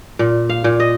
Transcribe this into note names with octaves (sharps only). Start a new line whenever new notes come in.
A#2
F5
A#2
D#5